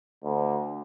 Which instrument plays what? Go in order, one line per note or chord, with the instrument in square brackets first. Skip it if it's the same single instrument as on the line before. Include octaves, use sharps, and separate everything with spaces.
[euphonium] D2